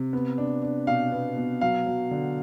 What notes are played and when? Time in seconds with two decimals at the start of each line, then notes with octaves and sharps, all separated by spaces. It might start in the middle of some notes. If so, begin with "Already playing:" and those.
Already playing: C3
0.13 B3
0.38 D4
0.62 D4
0.87 B2 F5
1.12 B3
1.37 B2
1.61 F#3 F5
1.86 F#3
2.11 D3